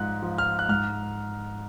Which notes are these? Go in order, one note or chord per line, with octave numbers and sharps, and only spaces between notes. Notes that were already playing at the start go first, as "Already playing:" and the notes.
Already playing: G#2 F3 F#6
F3
F6
F#6
G#2 F6